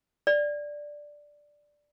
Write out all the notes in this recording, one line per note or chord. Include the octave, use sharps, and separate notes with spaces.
D5